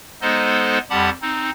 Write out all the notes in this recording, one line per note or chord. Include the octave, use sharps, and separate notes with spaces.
G#3 B3 D#4 A4 C5 D#5
F2 G3 G4 F#5 A5 B5
C4 D#4